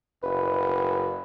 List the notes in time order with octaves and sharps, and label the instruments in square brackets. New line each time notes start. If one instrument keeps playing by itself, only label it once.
[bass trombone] F#1 [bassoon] B4